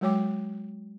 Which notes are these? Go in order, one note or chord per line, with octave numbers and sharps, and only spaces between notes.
F#3 G#3 F#4 C#5 G5 D6